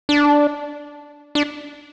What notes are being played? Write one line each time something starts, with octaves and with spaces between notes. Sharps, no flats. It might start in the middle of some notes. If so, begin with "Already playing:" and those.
D4
D4